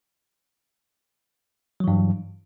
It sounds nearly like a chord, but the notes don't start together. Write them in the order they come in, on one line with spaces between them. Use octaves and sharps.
F#3 E3 G2